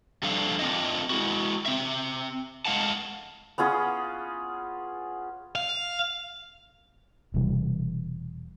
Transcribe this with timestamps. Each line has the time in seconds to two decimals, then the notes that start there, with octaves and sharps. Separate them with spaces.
0.23 F3 G3 A3 D4 A4 F5
0.59 A3 C4 D4 F4 D#5 E5
1.10 G#3 E4 F#4
1.66 C4 E5
2.66 A2 G#3 D#4 F5 F#5 A5
3.58 B3 C#4 F4 G#4
5.56 F5
7.34 E1 E2 C3 G3